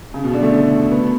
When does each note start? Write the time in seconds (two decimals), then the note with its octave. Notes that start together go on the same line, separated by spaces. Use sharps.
0.14 C#3
0.24 B2
0.33 D3
0.43 A3
0.91 B3